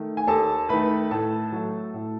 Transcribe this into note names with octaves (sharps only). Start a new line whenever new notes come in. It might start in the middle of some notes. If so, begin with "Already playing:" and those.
Already playing: D#3 A3
G#5
D#2 A4 A5
D#3 A3 B4 B5
A2 A4 A5
F#3 A3
A2